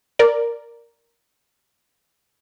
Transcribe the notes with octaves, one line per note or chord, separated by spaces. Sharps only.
A#4 D5